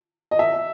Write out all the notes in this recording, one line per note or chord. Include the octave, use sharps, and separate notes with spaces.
D#5
E5